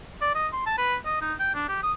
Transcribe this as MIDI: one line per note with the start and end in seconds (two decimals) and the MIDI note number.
0.21 0.33 74
0.35 0.48 75
0.53 0.62 84
0.66 0.77 81
0.78 0.96 71
1.05 1.21 75
1.21 1.34 63
1.40 1.53 79
1.54 1.68 62
1.69 1.80 67
1.83 1.93 87